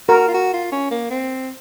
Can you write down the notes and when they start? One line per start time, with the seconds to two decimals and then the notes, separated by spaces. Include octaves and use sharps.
0.09 F#4 A#4
0.28 F4
0.34 F#4
0.53 F4
0.72 C#4
0.91 A#3
1.10 C4